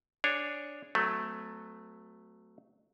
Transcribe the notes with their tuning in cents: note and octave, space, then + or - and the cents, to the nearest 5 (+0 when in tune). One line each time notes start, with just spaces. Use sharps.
D4 +0 G#4 +0 C#5 +0
F#3 +0 A3 +0 C4 -45